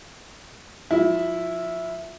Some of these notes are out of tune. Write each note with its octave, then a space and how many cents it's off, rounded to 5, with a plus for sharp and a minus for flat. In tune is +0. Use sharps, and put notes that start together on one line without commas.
F3 +25 E4 +0 E5 +0